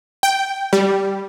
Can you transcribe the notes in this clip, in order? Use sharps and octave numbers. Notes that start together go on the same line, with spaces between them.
G5
G3